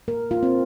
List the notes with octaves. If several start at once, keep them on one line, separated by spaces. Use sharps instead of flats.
A#3 A#4
A#3 F4
C4